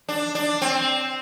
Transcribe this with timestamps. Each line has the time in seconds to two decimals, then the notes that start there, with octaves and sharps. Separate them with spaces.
0.09 D4
0.35 D4
0.62 C4